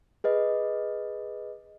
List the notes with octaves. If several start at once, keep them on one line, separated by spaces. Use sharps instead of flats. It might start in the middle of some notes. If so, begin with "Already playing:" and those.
G#4 B4 D#5